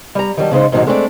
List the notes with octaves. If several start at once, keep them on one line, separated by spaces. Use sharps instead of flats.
G3 A#5
D#3 F#3 G3 A5
C#3 G#3 D#4 C5
G#2 B2 D#3 E3 F#3 G#3
G#3 A3 C4 D4 G4 D5